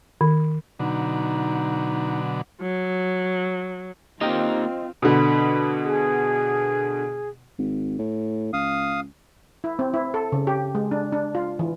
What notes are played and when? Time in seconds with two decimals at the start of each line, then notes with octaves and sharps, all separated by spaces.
0.21 D#3
0.79 B2 D3 F#3 D#4
2.61 F#3
4.21 A#3 C4 D#4 F4 G4 D#5 G5
5.02 B2 D3 B5
5.83 G#4
7.58 G#1
7.99 A2
8.53 C#2 F5 D#6
9.64 E4
9.79 C4
9.94 E4
10.14 A4
10.32 C#3
10.47 G4
10.75 G#3
10.91 D4
11.12 D4
11.35 F4
11.59 E3